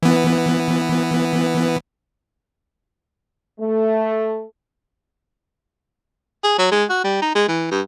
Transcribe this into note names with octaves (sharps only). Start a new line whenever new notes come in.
E3 B3
A3
G#4
F#3
G#3
F#4
G3
D#4
G#3
E3
G2